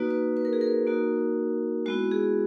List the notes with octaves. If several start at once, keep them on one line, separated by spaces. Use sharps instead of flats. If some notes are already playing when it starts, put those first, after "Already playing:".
Already playing: A#3 D#4 F#4 B4
B4
B4
A#4
G#4
A#4
A#3 D#4 F#4
G#3 B3 E4 F#4
G#4